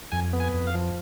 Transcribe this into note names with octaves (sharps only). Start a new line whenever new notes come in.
F2 G#5
B3
G#5
F2
F5
F3